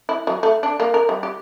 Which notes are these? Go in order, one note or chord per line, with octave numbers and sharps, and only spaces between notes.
E4
F#3
A3
D4
A#3
A#4
G3
G4